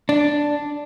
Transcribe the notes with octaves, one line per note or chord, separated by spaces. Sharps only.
D4